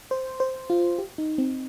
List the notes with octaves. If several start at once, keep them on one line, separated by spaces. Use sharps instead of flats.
C5
C5
F4
G4
D#4
C4